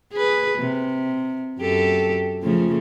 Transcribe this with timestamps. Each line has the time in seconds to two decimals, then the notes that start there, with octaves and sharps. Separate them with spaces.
0.13 G#4 B4
0.58 C3
1.59 F#2 G4 A4
2.43 C#3 F3 A3